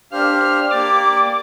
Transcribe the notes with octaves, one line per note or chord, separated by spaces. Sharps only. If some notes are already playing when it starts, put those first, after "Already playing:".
D4 G4 C5 F5 F6
F6
A#3 G4 D5 D6